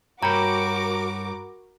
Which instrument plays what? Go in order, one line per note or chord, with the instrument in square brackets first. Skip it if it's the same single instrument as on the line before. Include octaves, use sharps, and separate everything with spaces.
[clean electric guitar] G2 C#5 G5 [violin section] F#4 A#4 D6 [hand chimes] A#5 B5